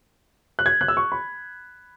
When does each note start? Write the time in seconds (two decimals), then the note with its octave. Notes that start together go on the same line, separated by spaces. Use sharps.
0.59 F#6
0.66 G#6
0.81 F#6
0.88 E6
0.97 C#6
1.12 B5